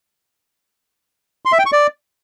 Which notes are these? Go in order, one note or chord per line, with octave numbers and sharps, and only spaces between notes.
C6
E5
G5
C#6
D5